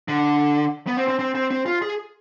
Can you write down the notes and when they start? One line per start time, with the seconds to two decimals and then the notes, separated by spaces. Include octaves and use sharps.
0.08 D3
0.87 B3
0.97 C4
1.08 C4
1.19 C4
1.35 C4
1.51 C4
1.66 F4
1.82 G#4